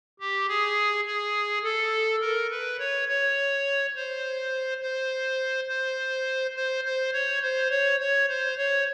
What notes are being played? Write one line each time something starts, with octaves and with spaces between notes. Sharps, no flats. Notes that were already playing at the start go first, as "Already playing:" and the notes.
G4
G#4
G#4
A4
A#4
B4
C#5
C#5
C5
C5
C5
C5
C5
C#5
C5
C#5
C#5
C5
C#5